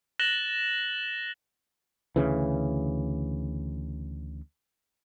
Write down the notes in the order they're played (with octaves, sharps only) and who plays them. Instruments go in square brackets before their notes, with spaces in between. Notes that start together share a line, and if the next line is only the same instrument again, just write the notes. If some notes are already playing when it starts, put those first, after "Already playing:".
[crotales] F#6 A6 A#6 E7 F#7 G7
[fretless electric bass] D2 C#3 E3